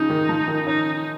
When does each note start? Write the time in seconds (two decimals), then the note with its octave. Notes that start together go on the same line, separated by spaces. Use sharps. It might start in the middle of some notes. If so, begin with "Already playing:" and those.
Already playing: C#3 F3 D#4
0.10 D#3
0.29 F3
0.48 D#3
0.67 C#4 D#4